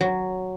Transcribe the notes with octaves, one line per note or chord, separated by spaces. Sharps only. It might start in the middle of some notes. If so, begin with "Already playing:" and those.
F#3